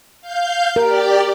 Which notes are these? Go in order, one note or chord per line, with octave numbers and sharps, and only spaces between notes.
F5 G6
G4 A#4 D5